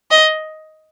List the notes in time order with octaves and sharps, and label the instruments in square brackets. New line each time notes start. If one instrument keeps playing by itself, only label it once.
[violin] D#5